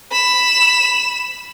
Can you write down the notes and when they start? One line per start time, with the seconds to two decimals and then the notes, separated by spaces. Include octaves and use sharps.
0.11 B5 E7